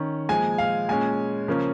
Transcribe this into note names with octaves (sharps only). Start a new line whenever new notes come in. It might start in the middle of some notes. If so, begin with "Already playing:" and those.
Already playing: D#3 C#4
A#2 F3 G#3 G#5
F5
A#2 G#3 C#4 G#5
C#3 F3 A#3 C#4